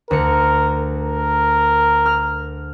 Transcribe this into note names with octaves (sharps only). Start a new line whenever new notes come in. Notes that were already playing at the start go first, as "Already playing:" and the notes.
D2 A#4 C#7
A#4
F6